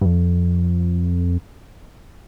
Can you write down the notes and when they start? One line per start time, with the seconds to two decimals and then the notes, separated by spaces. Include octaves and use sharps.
0.01 G2
0.05 F2